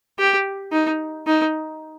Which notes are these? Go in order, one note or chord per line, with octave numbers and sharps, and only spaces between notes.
G4
D#4
D#4